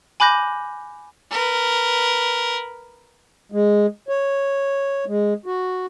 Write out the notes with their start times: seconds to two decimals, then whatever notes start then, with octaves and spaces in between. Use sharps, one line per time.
0.20 G#5 B5 D6 F#6 G6 A#6
1.31 A#4 B4
3.52 G#3
4.09 C#5
5.07 G#3
5.46 F#4